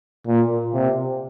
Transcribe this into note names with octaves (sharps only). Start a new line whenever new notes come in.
A#2
C3